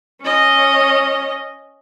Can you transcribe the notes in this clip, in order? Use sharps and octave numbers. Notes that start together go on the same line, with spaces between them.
C#4 D#5